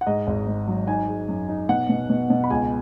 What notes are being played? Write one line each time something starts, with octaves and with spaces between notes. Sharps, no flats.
F#5
G#2 D#5
G#1
G#2
F#3
D#4 G#5
G#3
F#2
D#4
B2 F#5
B2
B2
B2
B5
C#2 G#5